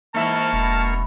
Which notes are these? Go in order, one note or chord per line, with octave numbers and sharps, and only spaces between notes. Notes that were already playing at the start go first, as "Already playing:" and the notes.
G#2 E3 A#3 E5 A5 C#6 F6
E1 B2